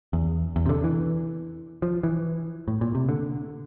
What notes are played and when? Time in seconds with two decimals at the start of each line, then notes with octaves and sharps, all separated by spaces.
0.13 E2
0.56 E2
0.66 C3
0.69 D3
0.84 E3
1.82 F3
2.03 E3
2.68 A2
2.81 A#2
2.95 C3
3.09 D3